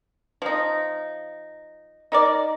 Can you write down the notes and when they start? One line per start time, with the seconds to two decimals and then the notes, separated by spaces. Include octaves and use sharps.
0.42 F3 D#4
2.12 D#4 A#4 D5